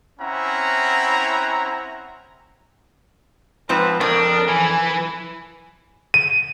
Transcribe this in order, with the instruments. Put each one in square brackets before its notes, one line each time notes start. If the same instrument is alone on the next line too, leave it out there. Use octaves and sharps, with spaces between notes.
[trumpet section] C4 C#4 E4 F#5 A#5
[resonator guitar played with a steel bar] G#2 F3 C4 [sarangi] B4
[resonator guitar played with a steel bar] F2 [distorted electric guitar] D4 [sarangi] A#4
[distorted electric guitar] E3 [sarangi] G#5
[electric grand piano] D#7